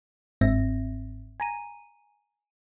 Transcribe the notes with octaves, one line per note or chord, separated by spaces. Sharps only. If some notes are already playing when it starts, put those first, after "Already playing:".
G1 G#2 C4 E5 A#6
G#5 A#5 D#7